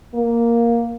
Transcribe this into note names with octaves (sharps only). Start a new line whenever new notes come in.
A#3